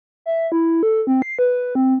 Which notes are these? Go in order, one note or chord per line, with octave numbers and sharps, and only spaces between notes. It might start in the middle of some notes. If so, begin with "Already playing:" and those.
E5
E4
A4
C4
C7
B4
C4